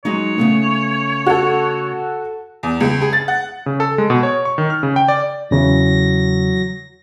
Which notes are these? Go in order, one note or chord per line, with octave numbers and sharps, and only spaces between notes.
F#3 G#3 D#4 C#5
C#3 A3 B3
F#4 A4
E2
C#2
G#4
A6
F#5
C#3
A4
G#3
B2
C#5
C#6
D#3
F6
C#3
G5
D5
E2 C#3 E3 F#3 A#6